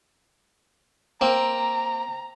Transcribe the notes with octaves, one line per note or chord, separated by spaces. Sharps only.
A#3 C4 A#5